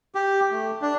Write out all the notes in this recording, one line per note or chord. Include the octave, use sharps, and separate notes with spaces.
G4
A3
D4